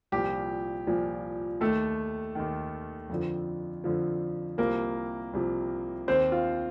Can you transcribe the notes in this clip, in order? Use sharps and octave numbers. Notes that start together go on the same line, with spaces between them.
C2 A#2 F3 G4
C2 A#2 F3
D#2 D#3 A3 A4
D#2 D#3
F2 D3 F3
F2 D3 F3
C2 C3 F3 A#3 A#4
C2 C3 F3
D#2 D#3 C4 C5
F4